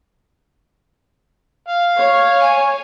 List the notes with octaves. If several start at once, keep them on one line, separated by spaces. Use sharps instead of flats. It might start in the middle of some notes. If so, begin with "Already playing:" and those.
F5
C#5
G#5